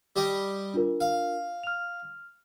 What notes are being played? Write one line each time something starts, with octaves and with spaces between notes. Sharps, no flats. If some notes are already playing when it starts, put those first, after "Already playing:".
G3 G4 D#5
D4 F4 A#4
F5
F6 F7